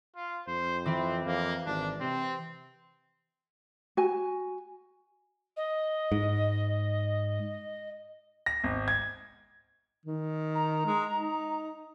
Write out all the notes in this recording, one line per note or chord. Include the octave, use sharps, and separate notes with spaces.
F4
F2 C5
E3 C4 B4 D6
F2 A#3
G#1 D4
C3 C4
F#4 G#5
D#5
G#2
A#6
G#1
G#6
D#3
A#5
G#3
D#4